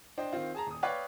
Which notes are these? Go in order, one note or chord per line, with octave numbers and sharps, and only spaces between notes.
D4 C5 D#5 G5
D#3 C4 F4
G#4 A5 A#5
D#1 D#6
B4 C#5 D5 F5 G5 F#6